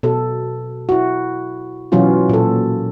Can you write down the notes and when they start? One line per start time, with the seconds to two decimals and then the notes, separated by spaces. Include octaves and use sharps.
0.03 B2 A4
0.89 E4 F#4
1.92 B2 E3 F#3 C#4 F4 F#4
2.29 A#2 A4